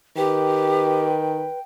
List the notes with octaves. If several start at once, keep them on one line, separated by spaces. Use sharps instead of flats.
D#3 G4 B4 G5